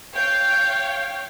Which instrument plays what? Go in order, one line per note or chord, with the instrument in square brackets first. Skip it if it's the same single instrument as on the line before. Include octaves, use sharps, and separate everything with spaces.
[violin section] C#5 F5 G5 [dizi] G6